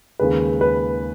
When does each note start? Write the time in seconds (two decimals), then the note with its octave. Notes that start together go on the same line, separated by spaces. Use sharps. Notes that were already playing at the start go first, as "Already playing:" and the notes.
0.19 D#2 C#3 G#3 B4
0.61 B4